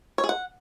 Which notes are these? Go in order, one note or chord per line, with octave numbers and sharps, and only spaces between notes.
C#5
G#4
F#5